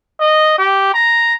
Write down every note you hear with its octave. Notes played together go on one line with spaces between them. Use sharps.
D#5
G4
A#5